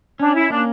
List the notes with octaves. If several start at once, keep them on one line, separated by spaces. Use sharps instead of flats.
C#4 D4
E4
A#3 D4